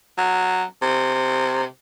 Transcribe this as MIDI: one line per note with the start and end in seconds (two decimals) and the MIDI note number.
0.18 0.63 54
0.82 1.64 48